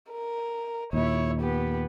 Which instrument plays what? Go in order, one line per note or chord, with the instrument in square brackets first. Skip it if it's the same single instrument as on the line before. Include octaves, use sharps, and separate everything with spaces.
[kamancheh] A#4
[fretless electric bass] D#2 A#2 [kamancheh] E4 C#5
[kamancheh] B3 G4